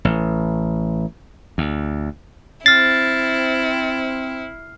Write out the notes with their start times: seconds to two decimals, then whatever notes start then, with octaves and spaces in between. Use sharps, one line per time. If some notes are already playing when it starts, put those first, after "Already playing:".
0.05 A1
1.58 D2
2.66 C4 E4 F6 A6 C7